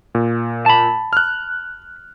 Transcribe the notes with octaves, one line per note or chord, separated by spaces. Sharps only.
A#2
A5 B5
F6 F#6